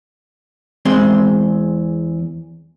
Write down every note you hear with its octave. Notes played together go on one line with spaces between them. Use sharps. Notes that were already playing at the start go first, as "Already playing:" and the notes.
E2 G#3 C4 C6